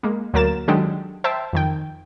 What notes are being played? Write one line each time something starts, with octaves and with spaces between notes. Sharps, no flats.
G#3 A#3
D2 F#3 A#3 A#4 A6 E7
D#3 F#3 G#3 D4 G4 A4
C5 E5 G5 A5
F2 D#3 G5